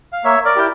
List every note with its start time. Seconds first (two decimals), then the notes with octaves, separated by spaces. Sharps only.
0.13 F5
0.24 A#3 C#5 E5
0.45 A#4 D5
0.56 E4 G4 G5